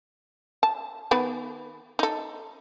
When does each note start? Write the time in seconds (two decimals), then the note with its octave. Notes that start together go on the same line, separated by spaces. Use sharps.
0.63 A5
1.11 D#3 B3 B4
1.99 D#4 A4